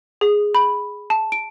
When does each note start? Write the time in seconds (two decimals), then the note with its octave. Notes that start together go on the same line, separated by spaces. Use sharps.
0.21 G#4
0.55 B5
1.10 A5
1.32 D7